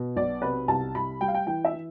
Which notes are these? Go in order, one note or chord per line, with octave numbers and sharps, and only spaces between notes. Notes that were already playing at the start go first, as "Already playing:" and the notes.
Already playing: B2
B1 D5
C3 B4
C2 A5
C2 B5
G3 G5
F5
G5
E3 G5
E5
E3